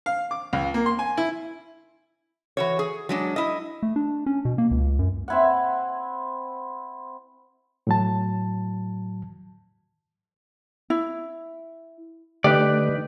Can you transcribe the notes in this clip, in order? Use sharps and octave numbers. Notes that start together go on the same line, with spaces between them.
F5
D6
C#2
A#3
C6
G#5
E4
E3 F#4 C#5
G#4
F#3 G#3 D4
E4 D#5
A3
D4
C#4
B2
A#3
C#2
F#2
C4 E4 F#5
A2 F#3 A5
E4
D3 A3 D#4 G4 B4 D5